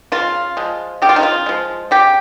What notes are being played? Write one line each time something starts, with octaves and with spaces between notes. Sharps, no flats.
C#3 F4
F3 G#3
C#3 G4
F4
D#4
F4
F3 G#3
C#3 G4